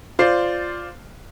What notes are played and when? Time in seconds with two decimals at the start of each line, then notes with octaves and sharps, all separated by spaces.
0.19 F4 C5 D5 C7